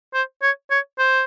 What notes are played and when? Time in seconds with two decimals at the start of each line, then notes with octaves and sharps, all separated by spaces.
0.14 C5
0.42 C#5
0.71 C#5
0.98 C5